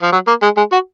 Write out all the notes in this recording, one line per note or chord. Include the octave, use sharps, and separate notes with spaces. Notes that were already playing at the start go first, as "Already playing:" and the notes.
F3
F#3
A#3
G#3
G#3
F#4